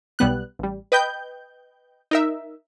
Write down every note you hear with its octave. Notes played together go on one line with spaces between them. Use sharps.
B1 G3 B3 F#6
A1 G3
B4 D#5 G5 G6
D#4 A#4 E5